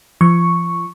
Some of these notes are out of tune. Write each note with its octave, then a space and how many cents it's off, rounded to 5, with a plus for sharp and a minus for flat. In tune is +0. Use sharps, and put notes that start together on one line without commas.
F3 -30 C#6 +0